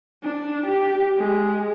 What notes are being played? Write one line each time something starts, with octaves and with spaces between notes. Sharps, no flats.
D4
G4
G#3